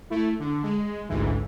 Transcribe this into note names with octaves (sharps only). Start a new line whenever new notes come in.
A3 E4
D3
G#3
A1 D2 G#2 E3